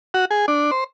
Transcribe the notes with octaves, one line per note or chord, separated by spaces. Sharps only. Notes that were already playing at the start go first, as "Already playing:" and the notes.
F#4
G#4
D4
C5